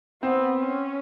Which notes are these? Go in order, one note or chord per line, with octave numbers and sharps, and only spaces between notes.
B3 C4
C#4